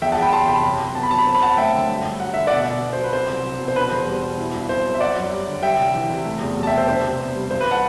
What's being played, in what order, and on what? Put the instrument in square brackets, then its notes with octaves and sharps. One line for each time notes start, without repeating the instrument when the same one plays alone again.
[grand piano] E2 E5 G5
F#5 A5
E2
G5 B5
F#3 A5 C6
C3 G5 B5
F#2
F#2
B3 A5
B5
F#3 A5
B5
C4 A5
B5
F#2 F#5 A5
A3 E5 G5
D3
G2
G2
F#3 F#5
D3 E5
B2 D5 F#5
B2
B3
C5
F#3
B4
C4 C5
C2
F#3
B2
C5
D4 B4
E2 C5
G3
B2
E4
G2
C4 C5
F#3
E5
F#2 D5 F#5
F#2
G3
D3
G3 E5 G5
C2
E3
C3
A3
E2
F#3
A5
E5 G5
B2
C5 E5
D4 C5
C3
B3
G3
G2 C5
B4
F#5 A5